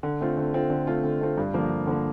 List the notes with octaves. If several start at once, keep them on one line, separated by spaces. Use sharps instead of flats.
D3
A3 C4 F4
D3
A3 C4 F4
D3
A3 C4 F4
D3
A3 C4 F4
G2
D3 F3 A#3
G2
D3 F3 A#3